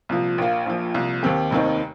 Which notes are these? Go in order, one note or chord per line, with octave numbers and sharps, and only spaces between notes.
C2 A#2 F3
A#1 A#2 A#3 F4
A#1 A#2 F3
C2 A#2 F3
D#2 D#3 C4 G4
F1 D#2 D#3 C4 D#4